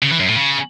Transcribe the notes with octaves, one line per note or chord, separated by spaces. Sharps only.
C#3
E3
F#2
A2
C#3